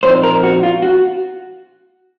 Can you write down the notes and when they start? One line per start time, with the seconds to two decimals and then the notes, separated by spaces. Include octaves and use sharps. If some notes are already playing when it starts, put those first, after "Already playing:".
0.03 A#2 F3 C4 D#4 C5
0.23 A#4
0.43 F#4
0.63 F4
0.82 F#4